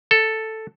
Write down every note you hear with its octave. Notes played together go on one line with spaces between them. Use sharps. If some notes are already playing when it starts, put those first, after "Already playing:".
A4